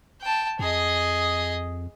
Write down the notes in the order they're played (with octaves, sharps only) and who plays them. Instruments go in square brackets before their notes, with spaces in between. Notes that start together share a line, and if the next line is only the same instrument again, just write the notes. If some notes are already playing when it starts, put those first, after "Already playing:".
[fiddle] G5 A5
[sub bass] F2 [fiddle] G#4 D#5